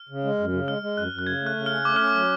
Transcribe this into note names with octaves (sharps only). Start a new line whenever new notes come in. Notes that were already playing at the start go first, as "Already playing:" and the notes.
Already playing: F6
C#3
G#3
F#2
C#3
G#3 F6
G#3
F#2 F#6
F#2
F#6
C#3 G#6
A3
F#6
C#3
C#4 F6
A3 D6
C#4 F6
D6
F#3